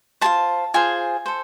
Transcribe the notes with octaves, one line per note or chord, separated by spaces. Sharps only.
F4 G#4 C5 A5
F4 G#4 C5 G#5
A4 C5